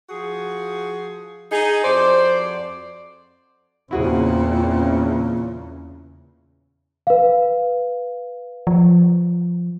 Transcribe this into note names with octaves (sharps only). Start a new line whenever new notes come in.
F3 F#4 G#4
D#4 G#4
F2 F#4 C5 D5
E2 A#2 C#3 C4 E4 F#4 G#4
B4 F5
F3